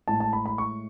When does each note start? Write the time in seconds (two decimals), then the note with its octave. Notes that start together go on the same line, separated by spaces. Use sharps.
0.07 A2 G#3 A5
0.20 A5
0.33 B5
0.46 B5
0.58 C#6